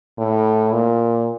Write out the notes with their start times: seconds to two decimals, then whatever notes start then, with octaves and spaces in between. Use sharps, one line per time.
0.18 A2
0.72 A#2